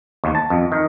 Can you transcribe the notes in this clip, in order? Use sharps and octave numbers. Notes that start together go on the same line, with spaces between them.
D#2
A5
F2
D#3